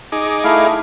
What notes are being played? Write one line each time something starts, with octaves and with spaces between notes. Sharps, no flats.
D#4 G#4 D6
A3 E4 F5